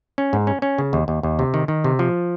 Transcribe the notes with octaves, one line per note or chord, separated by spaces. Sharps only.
C#4
G#2
C#4
C#4
C#3
D#2
D#2
D#2
C3
D#3
D#3
C3
F3